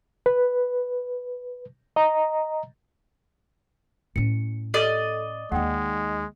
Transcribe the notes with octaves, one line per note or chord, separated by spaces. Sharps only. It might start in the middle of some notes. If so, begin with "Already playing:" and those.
B4
D#5 A#5
A2 C#4 C#7
A4 D5 D#5
D#2 G#3 D#4 F#5 G5